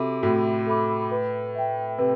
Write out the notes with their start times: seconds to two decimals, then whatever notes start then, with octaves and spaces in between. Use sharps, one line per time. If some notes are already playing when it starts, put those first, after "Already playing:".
Already playing: C3 F#4 A4 E5 B5 D6
0.23 A2 F#4
0.67 A4 E5 B5 D6
1.11 B4
1.55 E5 G5
1.98 C3 B4